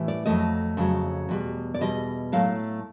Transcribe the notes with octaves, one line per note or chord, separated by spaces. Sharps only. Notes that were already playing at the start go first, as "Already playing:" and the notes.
Already playing: A2 E3 G3
D5
F2 C#3 F#3 A3 D#5
F2 C#3 F#3 A3
E2 B2 G3
D5
E2 B2 G3 D#5
A2 F#3 A3 F5